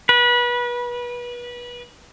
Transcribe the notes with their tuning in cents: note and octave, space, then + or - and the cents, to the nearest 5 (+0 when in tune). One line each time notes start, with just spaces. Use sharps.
B4 -30